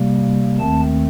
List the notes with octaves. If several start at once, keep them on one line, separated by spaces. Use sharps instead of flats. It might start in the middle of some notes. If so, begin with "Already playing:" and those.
Already playing: C3 G3 A#3
D#2 D#3 A3 C4 A5